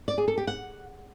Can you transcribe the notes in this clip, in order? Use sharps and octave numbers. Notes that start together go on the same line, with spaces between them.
D5
G#4
A4
G4
F#5